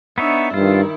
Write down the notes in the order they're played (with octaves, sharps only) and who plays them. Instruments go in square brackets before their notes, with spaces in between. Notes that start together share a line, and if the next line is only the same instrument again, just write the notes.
[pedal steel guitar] B3 D#4 C#5 [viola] D4 E5
[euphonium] G2 [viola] D#3 E4 [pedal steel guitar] F4